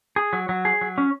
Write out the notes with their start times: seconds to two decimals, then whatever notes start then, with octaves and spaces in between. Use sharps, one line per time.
0.16 G#4
0.33 F#3
0.49 F#3
0.65 G#4
0.81 F#3
0.98 C#4